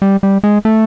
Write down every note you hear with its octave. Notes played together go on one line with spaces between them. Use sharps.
G3
G3
G#3
A3